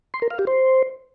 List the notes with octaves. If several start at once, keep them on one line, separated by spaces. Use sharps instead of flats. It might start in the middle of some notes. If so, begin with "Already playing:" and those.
C6
A#4
F5
G4
C5